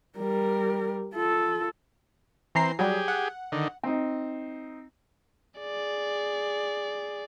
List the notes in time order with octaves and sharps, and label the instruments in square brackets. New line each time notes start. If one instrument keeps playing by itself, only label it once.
[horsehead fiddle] G3 A#4
F4 A4
[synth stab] E3 A#5 C7 [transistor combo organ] C4
[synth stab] F#3 G3 [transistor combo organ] G4 G#4
[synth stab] F#5
[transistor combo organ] D3 D#3
[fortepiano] C4 D#4
[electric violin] G#4 D5